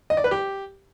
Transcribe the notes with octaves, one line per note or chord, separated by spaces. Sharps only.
D#5
D5
B4
G4